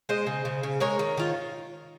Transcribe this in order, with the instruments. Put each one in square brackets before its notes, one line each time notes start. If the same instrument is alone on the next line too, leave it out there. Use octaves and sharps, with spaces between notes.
[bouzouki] G#3 C5 D#5
C#3
C#3
C#3
G#3 A#4 C#5
D#3
D#3 F4